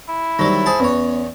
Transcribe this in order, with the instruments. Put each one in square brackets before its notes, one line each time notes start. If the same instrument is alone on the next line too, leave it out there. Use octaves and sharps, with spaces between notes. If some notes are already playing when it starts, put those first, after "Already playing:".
[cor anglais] E4
[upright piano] D#3 C5 A#6 [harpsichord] F#3 G3
[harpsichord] G#4 A5 [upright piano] C5
[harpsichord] E2 C#5 [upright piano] B3 C#4 B4